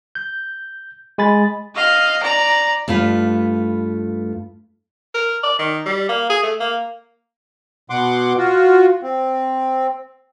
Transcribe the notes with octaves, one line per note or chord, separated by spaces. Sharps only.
G6
G#3 G#5 B5 A6
D#5 F5
D5 A#5
G2 A3 F4 B4
A#4
D5
D#3
G3
A#3
G#4
A3
A#3
B2 F#5 C6 D6
F4 F#4
C4